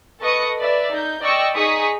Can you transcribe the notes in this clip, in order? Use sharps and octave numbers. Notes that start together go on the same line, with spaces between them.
A4 B4 D#5 C#6 D#6 C#7
B4 D5 E5
D#4 G6
D5 D#5 G5 C#6 E6
D#4 G#4 C#6 D#6 B6